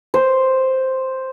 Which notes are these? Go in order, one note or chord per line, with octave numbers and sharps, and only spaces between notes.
C5